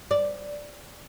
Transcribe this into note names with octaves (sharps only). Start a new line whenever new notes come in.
D5